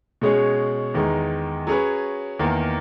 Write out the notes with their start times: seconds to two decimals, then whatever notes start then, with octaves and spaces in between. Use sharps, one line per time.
0.21 B2 G#3 C#4 G#4
0.94 E2 D#3 G#3 D#4
1.67 F#3 C#4 G#4 B4
2.39 E2 D#3 A#3